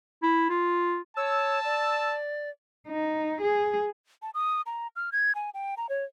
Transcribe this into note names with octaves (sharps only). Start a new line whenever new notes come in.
E4
F4
C#5 A5 E6
D5
D#4
G#4
A5
D#6
A#5
F6
G#6
G#5
G5
A#5
C#5